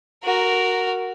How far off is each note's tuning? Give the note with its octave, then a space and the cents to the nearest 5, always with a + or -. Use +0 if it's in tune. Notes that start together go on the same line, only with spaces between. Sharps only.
F#4 +0 A#4 -5